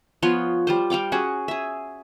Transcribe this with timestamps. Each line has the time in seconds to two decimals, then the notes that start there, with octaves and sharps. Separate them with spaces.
0.23 F3 B3 C#5 C6
0.67 G3 F4 C5
0.90 G3 F5 G5 D6
1.12 C#4 F#4 G#4
1.48 G#4 E5